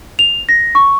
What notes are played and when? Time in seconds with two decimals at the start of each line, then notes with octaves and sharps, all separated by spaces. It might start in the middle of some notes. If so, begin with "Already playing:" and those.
0.19 F7
0.49 A#6
0.75 C#6